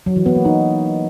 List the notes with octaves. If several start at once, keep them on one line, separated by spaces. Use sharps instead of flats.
F#3
E3
B3
A#3
D#4